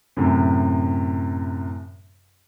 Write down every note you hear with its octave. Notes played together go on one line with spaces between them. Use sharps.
F#2 A2 C3